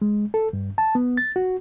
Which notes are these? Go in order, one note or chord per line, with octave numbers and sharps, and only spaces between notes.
G#3
A4
G2
A5
B3
A6
F#4